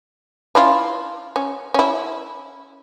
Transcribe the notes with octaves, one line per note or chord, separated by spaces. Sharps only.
C#4 E4 F4
C#4
C#4 E4